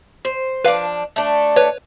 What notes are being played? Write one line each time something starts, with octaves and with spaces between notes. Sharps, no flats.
C5
F3 D4 B4 F5
A3 D4
B4 C#5